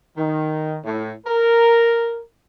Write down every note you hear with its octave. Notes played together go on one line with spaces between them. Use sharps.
D#3
A2
A#4